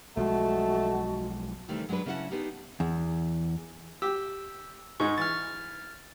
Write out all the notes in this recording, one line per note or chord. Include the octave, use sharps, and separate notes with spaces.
B1 F3 G#3 A3 F#4 D#5 F#5 A5
C3 D#3 E3 G3 A3
F#3 G#3 C4 D4 B4
C#3 C#4 E4 G4 F#5 A5
B3 D4 D#4 G4
E2
G4 E6
G#2 G#3 D#4 C#6
E3 F6 A6